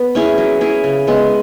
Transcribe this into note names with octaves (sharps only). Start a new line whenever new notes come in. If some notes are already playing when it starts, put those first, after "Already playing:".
Already playing: B3
C#4 E4 G#4
F#3
C#4 E4 G#4
C#3
G#3 B3